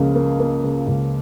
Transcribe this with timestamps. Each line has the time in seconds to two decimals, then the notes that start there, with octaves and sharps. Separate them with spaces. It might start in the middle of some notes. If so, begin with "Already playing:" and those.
Already playing: C#2 C#3 F3 A#3
0.15 A#3
0.40 A#3
0.64 C#3
0.87 C#2